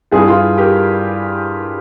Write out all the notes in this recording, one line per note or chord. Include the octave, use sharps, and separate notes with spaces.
G2 E3 F4 G#4
F4 G#4
G4 A#4